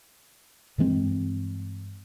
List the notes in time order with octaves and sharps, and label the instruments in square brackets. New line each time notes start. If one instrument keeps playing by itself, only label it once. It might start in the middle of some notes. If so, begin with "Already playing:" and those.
[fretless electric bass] G2 E3 G#3 C4